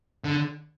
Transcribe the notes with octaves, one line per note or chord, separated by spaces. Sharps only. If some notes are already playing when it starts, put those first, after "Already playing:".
D3